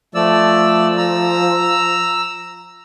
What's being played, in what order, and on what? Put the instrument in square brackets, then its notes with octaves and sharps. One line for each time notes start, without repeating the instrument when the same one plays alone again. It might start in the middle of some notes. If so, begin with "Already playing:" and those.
[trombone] F3 [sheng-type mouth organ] A3 D5 E6
[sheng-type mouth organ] A#5 E6